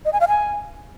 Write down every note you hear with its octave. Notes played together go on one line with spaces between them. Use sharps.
D#5
G#5
F5
G#5